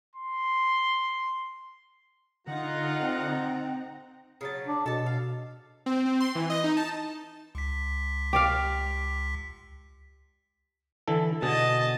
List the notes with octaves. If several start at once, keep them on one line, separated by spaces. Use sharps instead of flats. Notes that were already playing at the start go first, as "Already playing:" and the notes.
C6
D3 D#4 F4 F#5 A#5
C4
C#3 F#3 A5
D4
B2 A4 A5
F5
C4
C4
C6
E3
D#5
D#4
A5
C#2 B6
G4 D5 F5
D3 E3 A4
B2 D3 G#4 D#5 A5